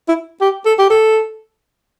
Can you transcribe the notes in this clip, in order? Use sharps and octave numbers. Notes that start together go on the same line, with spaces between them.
E4
G4
A4
G4
A4